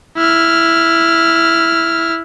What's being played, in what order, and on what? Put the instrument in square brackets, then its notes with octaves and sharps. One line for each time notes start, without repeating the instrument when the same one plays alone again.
[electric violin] E4 F6